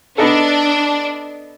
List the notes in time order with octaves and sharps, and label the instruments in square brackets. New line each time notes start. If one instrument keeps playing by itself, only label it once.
[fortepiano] B3 D#4 A4 [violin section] D4